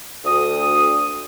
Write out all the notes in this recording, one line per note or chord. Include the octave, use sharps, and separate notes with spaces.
D2 D#6